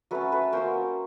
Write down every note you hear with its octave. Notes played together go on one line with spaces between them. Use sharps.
F#3 A3 C#4 A4 B4
A4 B4
F#3 A#3 C#4 A#4 C5